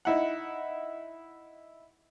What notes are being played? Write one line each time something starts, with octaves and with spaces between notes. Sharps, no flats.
D#4 E4 F#5